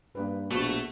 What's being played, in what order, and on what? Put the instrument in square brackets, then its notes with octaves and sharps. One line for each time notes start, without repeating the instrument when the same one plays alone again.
[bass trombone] G2 [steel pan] A#3 G4 B4
[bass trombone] A#1 [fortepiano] B2 [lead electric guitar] A3 [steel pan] A#3